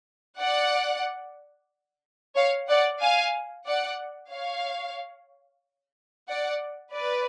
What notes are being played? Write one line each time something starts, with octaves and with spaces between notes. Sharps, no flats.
D5 F#5
C#5 F5
D5 F#5
F5 G#5
D5 F#5
C#5 F5
D5 F#5
B4 D5